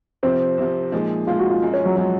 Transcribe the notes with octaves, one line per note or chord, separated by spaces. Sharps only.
C2 C3 F3 C4
C2 C3 F3
A#2 F3 G#3 D#4 G#4
A#2 F3 G#3 D#4 F4 G#4
F#4
F4
F#2 F3 G#3
C#4
F#3
F3 F#3 G#3